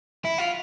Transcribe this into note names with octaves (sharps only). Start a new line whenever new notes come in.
E4
F4